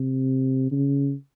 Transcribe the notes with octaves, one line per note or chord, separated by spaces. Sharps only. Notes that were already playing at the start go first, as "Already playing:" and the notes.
Already playing: C3
C#3